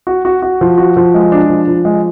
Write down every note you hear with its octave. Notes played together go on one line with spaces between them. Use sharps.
F#4
F#4
F#4
F3
F#4
F3
G#3
D4
F3
F3
G#3